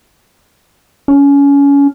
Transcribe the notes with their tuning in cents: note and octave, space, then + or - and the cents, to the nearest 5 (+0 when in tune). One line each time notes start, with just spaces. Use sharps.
C#4 +25